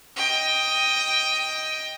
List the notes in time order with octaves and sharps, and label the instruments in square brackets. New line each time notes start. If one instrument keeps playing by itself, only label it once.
[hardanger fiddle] D#5 G5